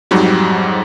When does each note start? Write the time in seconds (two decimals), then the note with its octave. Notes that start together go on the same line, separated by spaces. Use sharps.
0.11 F2 G#2 F#3 G3